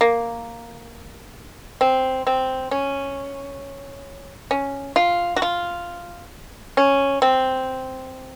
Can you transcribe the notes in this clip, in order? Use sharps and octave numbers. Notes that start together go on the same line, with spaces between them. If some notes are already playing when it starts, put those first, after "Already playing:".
A#3
C4
C4
C#4
C#4
F4
F#4
F4
C#4
C4